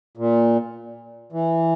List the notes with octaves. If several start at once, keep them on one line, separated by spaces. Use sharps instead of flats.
A#2
E3